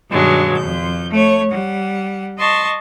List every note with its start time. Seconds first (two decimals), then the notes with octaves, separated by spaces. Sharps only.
0.11 G2 B2 D#3 F#3 G#3 D4
0.57 F2 G6
1.11 A3 C#5
1.51 G3 F#5
2.38 D#5 A5 C6 C#6